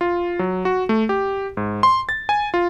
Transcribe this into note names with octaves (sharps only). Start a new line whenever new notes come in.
F4
F#3
F#4
A3
G4
G#2
C6
A6
G#5
F4